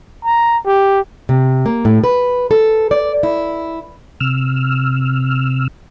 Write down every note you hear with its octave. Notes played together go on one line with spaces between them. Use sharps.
A#5
G4
C3
A#3
A2
B4
A4
D5
E4
C3 E6 F6